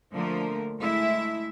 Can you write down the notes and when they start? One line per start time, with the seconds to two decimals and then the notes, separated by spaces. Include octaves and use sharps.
0.12 D3 F3 A3 A#3 A#4
0.80 G#3 A3 E4 E5